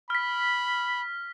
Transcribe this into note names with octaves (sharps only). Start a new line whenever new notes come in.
B5 F6 B6